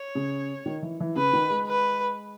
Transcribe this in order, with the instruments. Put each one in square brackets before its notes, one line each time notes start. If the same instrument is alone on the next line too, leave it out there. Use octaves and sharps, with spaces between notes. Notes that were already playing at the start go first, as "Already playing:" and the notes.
Already playing: [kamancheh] C#5
[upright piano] C#3
D#3
E3
E3
[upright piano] C#3 [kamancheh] B4
[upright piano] D#3
G#3
[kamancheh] B4